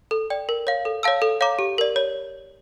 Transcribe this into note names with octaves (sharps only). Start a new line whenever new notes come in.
A4
D5 G5
A#4
C#5 F5
A4
C#5 F5 A5 E6
A4
C#5 F5 A#5 D6
G4
A#4 D5
C#5